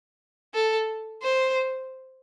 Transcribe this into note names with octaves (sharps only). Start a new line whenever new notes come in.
A4
C5